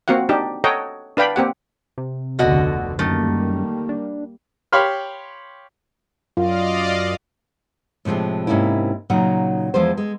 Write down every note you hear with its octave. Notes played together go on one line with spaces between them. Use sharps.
A#3 C4 F#4 F5 F#5
D4 D#4 G4
A4 C#5 D#5 F#5 G5 A#5
D4 B4 F5 G5 B5
A#3 C4 G4 F#5
C3
F1 D2 B2 D3 F#4 D#5
F#2 D#3 G3 A3 A#3
D4
G4 C#5 F5 B5 C6 F6
F#2 F4 D5 D#5 F5
A2 C3 F3 G#3 D4
G#2 C3 A#3 C#4 E4
A#2 C#3 F#3 D#4 F#5
E2 F3 G#3 C5
G#3